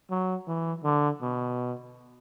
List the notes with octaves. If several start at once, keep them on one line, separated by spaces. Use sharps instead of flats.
F#3
E3
D3
B2